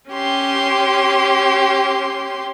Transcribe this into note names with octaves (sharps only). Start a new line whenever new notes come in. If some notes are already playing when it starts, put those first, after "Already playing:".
C#4 G4 C6